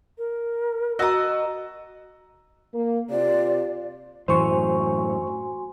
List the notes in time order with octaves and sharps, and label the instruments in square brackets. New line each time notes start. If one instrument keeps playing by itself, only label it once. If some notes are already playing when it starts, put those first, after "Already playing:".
[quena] A#4
[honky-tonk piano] F#4 [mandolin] D#5 A5 D#6 [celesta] A#5 E6
[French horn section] A#3
[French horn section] C3 F4 [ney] D5
[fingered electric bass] F#2 A2 [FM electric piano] E3 C#6 [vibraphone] F#4 G#5 C6 [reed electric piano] C5